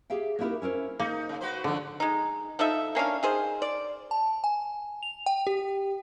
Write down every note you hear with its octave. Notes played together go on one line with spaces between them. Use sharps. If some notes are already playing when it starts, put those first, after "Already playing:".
G4 G#4 E5 F5 G5
A#3 B3 D#4 E4 G4 A#4
C#4 E4 A#4 C5
A#3 D#4
C#3
F#4 B4 C5
D3 D#3 F3
G#3 D#4
F3 D#4 A4 E5
A#3 C#4 D4 F5
D#3 G#4 C5
D5
A5
G#5
F7
G5
G4